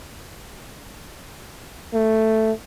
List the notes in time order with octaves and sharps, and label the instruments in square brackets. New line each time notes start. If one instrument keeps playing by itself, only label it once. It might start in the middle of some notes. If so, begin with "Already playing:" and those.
[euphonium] A3